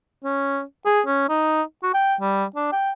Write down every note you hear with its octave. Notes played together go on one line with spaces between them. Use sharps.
C#4
G#4
C#4
D#4
F#4
G5
G3
D4
G5